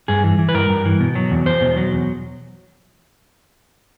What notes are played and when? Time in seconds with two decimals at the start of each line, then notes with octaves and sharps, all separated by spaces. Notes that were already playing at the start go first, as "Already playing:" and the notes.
0.08 G2 G#4
0.24 E3
0.39 E3
0.49 B4
0.54 G2 A#4
0.70 G2
0.85 E3
1.00 B2
1.15 F#3
1.31 E2
1.46 E2 C5
1.61 B2
1.77 F#3
1.93 E2